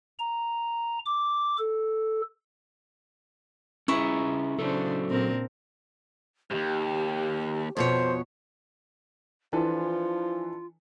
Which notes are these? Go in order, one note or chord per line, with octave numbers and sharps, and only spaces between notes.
A#5
D6
A4
C#4 E4 G#4 B4 A#5 C#6
C#3 F#3 D4 A4 C5
A#2 C4 A#4
D#2 G#2 G4
F2 B2 C5 C#5
E3 F3 D4 F4 A4 B4